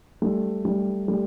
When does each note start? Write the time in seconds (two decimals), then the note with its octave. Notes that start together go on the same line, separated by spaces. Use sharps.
0.22 G3 A3
0.65 G3 A3
1.08 G3 A3